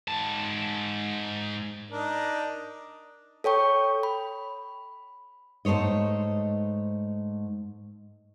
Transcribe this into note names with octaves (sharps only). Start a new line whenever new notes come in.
G#2 A5
D4 D#4 A#4
A4 C#5 G5 C#6
B5
G#2 A3 C5 C#5 D#5